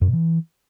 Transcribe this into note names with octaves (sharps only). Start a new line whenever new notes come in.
F#2
B2
E3